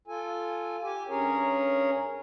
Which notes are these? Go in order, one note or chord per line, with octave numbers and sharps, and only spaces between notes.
F4 A4 G#5
G4 G#5
G2 C#4 G#4 A#4 C#5